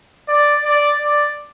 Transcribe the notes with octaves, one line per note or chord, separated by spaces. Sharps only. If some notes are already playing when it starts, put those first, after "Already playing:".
D5
D5
D5